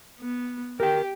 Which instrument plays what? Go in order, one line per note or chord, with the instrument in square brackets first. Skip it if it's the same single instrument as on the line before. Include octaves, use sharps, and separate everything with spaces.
[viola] B3
[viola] G4 [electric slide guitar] A#4 G5